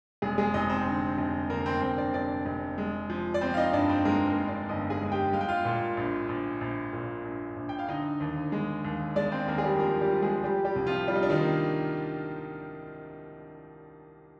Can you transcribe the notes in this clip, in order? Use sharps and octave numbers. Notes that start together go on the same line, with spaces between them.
F1 G#3 G#4
G#3 G#4
F1 D#4 D#5
C4 C5
D3
F1
D3 A#3 A#4
C4 C5
F1 C4 C5
D4 D5
F1 D4 D5
F1
G#3
F3
D5
F3 C4 C5
F5
D#4 D#5
G2 D4 D5
C4 C5
G#3 A#3 A#4
A#3 A#4
G2
D4 D5
G1 D#4 D#5
G#4 G#5
G#3
G4 G5
G#3 F5
G5
F4 F5
A#2
A#1
A#1
A#1
A#2
A#1
A#1
G5
F5
D3 D#4 D#5
D#2
G#3
D#2
G#3 D4 D5
C4 C5
D#2 A#3 A#4
G#4
G3 G4
F3 A#3 A#4
G3 G4
F3
G#3 G#4
G3 G4
G3 G4
C2
F3 F4
G3 F4
D#4
D4
D#3 D#4
A#3